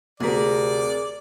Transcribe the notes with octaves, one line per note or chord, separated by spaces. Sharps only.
D2 C3 G#4 A#4 D5 B6